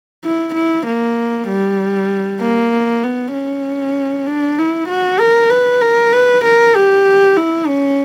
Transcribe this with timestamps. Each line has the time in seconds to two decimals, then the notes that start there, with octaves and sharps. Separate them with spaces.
0.25 E4
0.55 E4
0.86 A#3
1.48 G3
2.41 A#3
3.04 B3
3.33 C#4
4.26 D4
4.59 E4
4.89 F#4
5.20 A#4
5.50 B4
5.82 A#4
6.13 B4
6.45 A#4
6.75 G4
7.37 E4
7.67 C#4